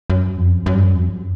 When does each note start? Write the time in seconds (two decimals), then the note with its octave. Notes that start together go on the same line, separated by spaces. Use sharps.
0.10 F#2
0.37 F2
0.66 F#2
0.75 G2
0.84 F#2
0.94 F2